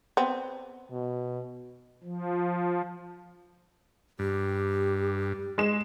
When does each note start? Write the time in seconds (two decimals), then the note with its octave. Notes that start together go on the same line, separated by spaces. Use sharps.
0.17 B3 C4
0.91 B2
2.03 F3
4.19 G2 G4
5.58 G#3 E7